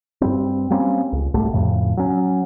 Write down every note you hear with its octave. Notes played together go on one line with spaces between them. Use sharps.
G2 G3 C4
G3 A#3 C4 C#4
C#2
C2 G#2 G3 A3
F2 A2 C#3
F#3 C#4